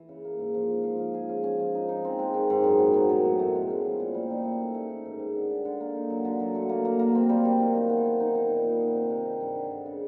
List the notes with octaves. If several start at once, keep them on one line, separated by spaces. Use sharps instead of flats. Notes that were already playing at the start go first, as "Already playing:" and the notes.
Already playing: E3
C#3
A#3
G#2
F3
F3
F3
F3
G#4
C#4
C#4
F3
D#4
D#4
C4
G#3
D#3
G#2
F#2
B3
F#3
A2
F#3
A3
G#3
C#4
F3
A#2
G3
D#4
A3
C#4
A3
D#3
G#2
G#2
D3
D3
D3
A#3
D#4
F#3
D3
F#3
A3
A#3
A#3
A#3
C4
G3
G3
D#3
D#3
B3
B3
D#4
D#4
A#2
B3
D#4
C3
C3
C3
G2
D3
D3
C#3